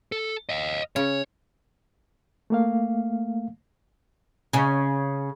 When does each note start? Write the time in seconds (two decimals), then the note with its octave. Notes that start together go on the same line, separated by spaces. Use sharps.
0.12 A4
0.49 D#5 F5
0.96 C#3 C#4 C#5
2.50 A3 A#3 F5
4.53 C#3 C#4